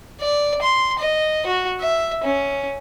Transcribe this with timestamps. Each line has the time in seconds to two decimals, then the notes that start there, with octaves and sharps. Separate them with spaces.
0.21 D5
0.62 C6
0.99 D#5
1.46 F#4
1.80 E5
2.24 C#4